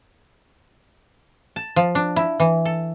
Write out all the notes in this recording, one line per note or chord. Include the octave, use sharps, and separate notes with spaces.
A5
F3
D4
E4
E3
A4